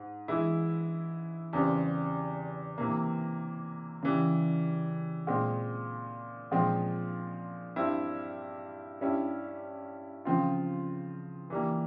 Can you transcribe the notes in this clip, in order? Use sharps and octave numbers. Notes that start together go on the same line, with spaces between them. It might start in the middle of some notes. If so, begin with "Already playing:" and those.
Already playing: G#2
E3 G#3 E4
E2 C#3 G3 C4
C3 E3 A#3
C#3 E3 G3
A#2 G#3 C4
A#2 F3 G#3 C4
G2 G3 C4 E4
G2 G3 C#4 E4
C#3 F3 C4 F4
E3 G3 A#3